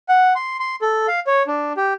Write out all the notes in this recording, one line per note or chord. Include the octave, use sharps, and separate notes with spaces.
F#5
C6
C6
A4
F5
C#5
D4
G4